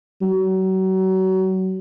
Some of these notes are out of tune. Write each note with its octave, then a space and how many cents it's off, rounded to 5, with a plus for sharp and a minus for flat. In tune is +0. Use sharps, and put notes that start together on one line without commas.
F#3 +30